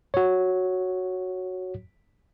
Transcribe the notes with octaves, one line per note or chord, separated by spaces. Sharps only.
F#4 C#5